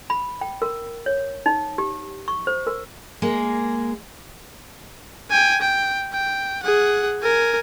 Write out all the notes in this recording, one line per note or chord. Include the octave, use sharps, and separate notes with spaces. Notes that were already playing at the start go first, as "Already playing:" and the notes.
B5
G5
A#4
C#5
D#4
G4
C#6
C5
A#4
G#3 A#3 G#4
G5 G#5
G5
G5
G#4 F#5
A#4 G#5